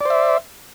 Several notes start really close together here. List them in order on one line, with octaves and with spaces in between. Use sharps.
D5 C5 E5